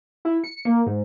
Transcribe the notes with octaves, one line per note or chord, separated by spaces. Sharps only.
E4
C#7
A#3
G#2